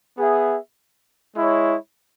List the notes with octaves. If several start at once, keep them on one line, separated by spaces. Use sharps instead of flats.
B3 G#4 E5
G#3 E4 C#5